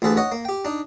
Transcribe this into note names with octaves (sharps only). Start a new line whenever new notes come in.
A1 D2 G#4 A4 B4 A5
C#5 D#5 F#5
A#3
G4 G5
D4 D#4